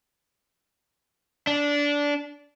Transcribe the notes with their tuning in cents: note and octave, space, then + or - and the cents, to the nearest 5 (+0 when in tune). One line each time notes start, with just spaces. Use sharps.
D4 -15